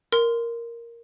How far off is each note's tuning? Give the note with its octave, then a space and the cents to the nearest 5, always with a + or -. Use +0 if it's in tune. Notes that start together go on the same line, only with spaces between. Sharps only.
A#4 +0 C6 -15